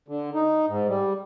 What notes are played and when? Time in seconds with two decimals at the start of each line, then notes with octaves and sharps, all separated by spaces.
0.08 D3
0.34 D#4
0.68 G#2
0.88 G3